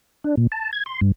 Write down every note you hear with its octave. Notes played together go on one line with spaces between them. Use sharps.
D4
A#2
A5
G#6
C6
G2